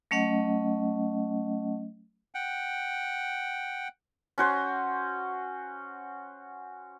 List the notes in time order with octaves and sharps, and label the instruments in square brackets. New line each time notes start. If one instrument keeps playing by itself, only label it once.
[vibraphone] F#3 A3 C#4 D#5 F#5
[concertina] F#5 G5
[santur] C#4 F#4 C5